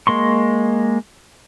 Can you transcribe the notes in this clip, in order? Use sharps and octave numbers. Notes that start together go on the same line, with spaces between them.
G#3 A#3 C6 C#6